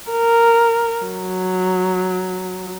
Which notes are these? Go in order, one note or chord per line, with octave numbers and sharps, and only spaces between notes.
A#4
F#3